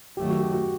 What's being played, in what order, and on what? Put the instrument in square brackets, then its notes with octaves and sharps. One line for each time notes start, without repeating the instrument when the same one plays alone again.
[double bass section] F#2 D#3 F#3 A3 [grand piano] G4
[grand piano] F#4
G4
F#4